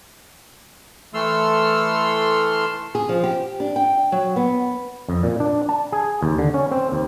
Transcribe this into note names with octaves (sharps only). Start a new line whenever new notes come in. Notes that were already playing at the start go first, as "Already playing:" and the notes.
E3 A3 A4 C6 E6 F6
G#4
F3
G4
D4
G5
F#3
B3
F2
A#2
D4
A5
G#4
D#2
D3
C#4
C4
D#2